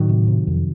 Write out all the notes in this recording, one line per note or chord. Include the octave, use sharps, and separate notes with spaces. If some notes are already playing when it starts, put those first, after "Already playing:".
Already playing: A2 D#3 F#3
C3
C3
F2